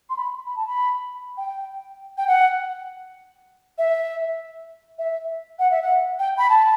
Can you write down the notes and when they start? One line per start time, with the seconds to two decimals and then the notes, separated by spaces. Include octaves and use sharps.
0.10 C6
0.17 B5
0.47 B5
0.56 A5
0.67 B5
1.37 G5
2.18 G5
2.27 F#5
3.78 E5
4.98 E5
5.59 F#5
5.71 E5
5.82 F#5
6.19 G5
6.38 B5
6.50 A5